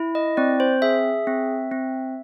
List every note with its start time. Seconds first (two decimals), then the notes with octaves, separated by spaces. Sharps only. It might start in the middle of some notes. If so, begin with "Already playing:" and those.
Already playing: E4
0.15 D#5
0.37 C4 D5
0.60 C5
0.82 G#4 E5
1.27 C4
1.72 C4